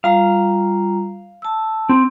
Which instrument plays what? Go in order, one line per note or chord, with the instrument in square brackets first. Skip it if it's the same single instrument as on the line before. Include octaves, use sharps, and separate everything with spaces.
[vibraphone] G3 F4 A#5 [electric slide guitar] F5
[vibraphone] A5 E6
[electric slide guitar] C4